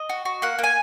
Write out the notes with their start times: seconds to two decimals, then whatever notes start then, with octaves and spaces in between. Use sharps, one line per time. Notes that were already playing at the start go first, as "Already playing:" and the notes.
Already playing: D#5
0.09 F#4
0.25 F#4
0.42 A#3 F#5
0.59 A#3 G#5